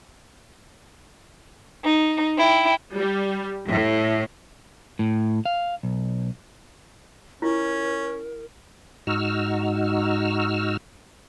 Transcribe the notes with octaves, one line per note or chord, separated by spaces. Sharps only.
D#4
E4 G5
G3
A2
A2
F5
B1
C#4 E4 F4 A#4
G#2 D#4 F#4 E6 F6